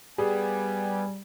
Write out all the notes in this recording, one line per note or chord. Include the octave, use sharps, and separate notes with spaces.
G3 B3 G#4 G#5